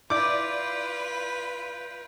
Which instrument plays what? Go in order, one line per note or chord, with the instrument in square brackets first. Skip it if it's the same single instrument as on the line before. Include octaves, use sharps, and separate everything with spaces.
[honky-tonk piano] E4 D5 [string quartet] F4 B4 [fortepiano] D6 [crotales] G6 D7